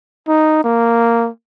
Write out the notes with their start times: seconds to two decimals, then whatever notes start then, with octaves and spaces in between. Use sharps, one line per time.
0.28 D#4
0.64 A#3